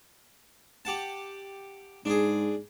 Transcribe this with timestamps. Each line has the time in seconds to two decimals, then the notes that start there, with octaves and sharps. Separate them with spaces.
0.85 G4 F#5 A5
2.05 G#2 D4 G#4